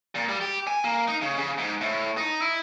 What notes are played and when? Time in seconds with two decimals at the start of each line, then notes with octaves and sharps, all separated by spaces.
0.15 A#2
0.29 G3
0.41 G4
0.67 G#5
0.84 A#3
1.08 D#4
1.21 C#3
1.38 C#3
1.58 G#2
1.81 A2
2.17 D#4
2.42 E4